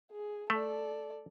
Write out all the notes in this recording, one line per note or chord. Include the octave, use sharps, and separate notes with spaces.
G#4
A3 A4 D5